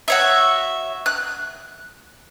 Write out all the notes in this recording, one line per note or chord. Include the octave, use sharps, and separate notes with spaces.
F#4 C#5 E5
F#6